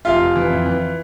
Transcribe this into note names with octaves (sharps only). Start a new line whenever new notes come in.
F1 F4 F5
F1
E3
F2
E3